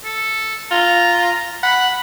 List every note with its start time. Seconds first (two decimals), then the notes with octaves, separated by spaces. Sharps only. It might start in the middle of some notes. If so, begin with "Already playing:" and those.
0.04 A4
0.71 F4 A#5
1.63 F#5 B5